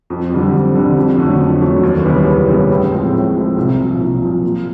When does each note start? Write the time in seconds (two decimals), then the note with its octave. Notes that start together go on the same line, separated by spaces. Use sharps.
0.10 F2
0.31 D3 G3 C4
0.53 F2
0.75 D3 G3 C4
0.96 F2
1.18 D3 F#3 A3
1.40 F2
1.61 D3 F#3 A3
1.83 D#2
2.04 C#3 E3 G3 B3
2.26 D#2
2.48 C#3 E3 G3 B3
2.69 A2
2.91 F3 G#3 C4
3.13 A2
3.34 F3 G#3 C4
3.57 C2
3.79 A#2 F3
4.00 C2
4.22 A#2 F3
4.43 A#2